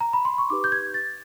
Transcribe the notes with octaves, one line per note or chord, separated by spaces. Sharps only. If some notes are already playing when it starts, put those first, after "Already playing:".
A#5
B5
C6
C#6
D#4 G4 B4 D6
G6
G#6
A6